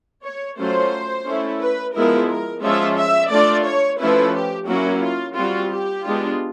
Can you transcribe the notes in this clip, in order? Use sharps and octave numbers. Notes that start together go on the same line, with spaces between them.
C#5
F#3 A3 C#4 F4 C5
A3 C#4 E4
B4
F3 G#3 B3 E4 A#4
A#4
F3 G#3 C#4 F4 E5
E5
A3 D4 F4 D5
C#5
F3 A3 C#4 E4 B4
G4
F#3 A#3 C#4 E4 F#4
F4
G3 C4 F4 F#4
G4
G#3 B3 D4 F4